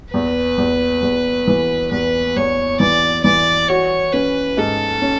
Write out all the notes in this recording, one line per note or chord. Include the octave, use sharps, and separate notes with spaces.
E2 B4
E2
E2
E3
E2 B4
E2 C#5
E3 D5
E3 D5
F#4 C#5
C#4 B4
G#2 A4
C#4